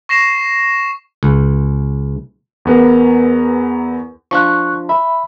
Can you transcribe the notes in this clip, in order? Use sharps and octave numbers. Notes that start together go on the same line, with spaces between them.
C#6 A#6 C7 E7
C#2
E2 B3 A#4
F3 D4 F4 C#6 F#6
E5 B5